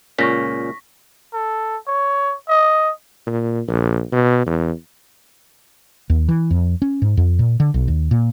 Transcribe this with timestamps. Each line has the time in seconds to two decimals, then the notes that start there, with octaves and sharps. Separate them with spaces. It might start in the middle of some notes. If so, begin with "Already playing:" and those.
0.18 C#2 A#2 C#4 C#6 A#6 B6
1.33 A4
1.87 C#5
2.49 D#5
3.26 A#2
3.68 A#1
4.12 B2
4.46 E2
6.10 D#2
6.29 E3
6.51 F2
6.82 C#4
7.02 G#2
7.17 F2
7.39 A#2
7.60 D3
7.74 B1
7.88 D#2
8.11 A#2